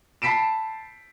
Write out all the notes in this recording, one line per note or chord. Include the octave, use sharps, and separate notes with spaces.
A5 B5 B6 C7 D7 E7